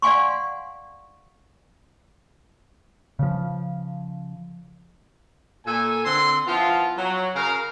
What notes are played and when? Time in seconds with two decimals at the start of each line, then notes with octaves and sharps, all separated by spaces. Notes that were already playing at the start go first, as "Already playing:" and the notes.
0.02 D5 F5 F#5 G#5 C6 C#6
3.19 C#3 F3
5.66 A#2 A4 G#5
6.05 D3 C4 C6
6.47 F3 B3 E4 F4
6.97 F#3
7.34 C#3 A#4 F5